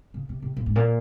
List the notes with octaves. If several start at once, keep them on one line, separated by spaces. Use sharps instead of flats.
C#3
C3
C3
A#2
G#2
A#2